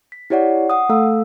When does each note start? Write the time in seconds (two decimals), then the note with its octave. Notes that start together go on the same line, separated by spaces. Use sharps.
0.12 B6
0.30 E4 G4 C#5 D5 F#5
0.70 F#5 D#6
0.89 A3 A4 F5 E6